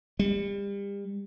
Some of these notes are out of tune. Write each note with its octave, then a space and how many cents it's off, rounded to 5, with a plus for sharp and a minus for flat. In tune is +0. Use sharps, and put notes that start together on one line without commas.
G3 +35